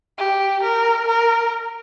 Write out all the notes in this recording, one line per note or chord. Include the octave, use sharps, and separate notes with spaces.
G4
A#4
A#4